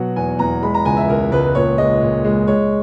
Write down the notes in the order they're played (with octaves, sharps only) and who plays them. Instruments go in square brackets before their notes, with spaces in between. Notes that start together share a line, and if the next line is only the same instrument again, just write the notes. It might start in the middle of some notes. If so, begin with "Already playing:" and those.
Already playing: [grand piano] B2 F#3 F#5
E2 G#5
E2 A#5
G#3 B5
A#5
C#2 G#5
E5
C#2 A#4
C#2 B4
A#2 C#5
G#3 D#5
A#2
G#3
G#3 C#5